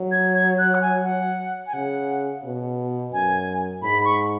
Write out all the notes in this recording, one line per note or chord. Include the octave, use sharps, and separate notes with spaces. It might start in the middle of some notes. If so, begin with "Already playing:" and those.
Already playing: F#3
G#6
G#6
F#6
F#5
G#5
F#5
G#5
C#3 F#5
B2
F#2 G#5
G#2 B5
C#6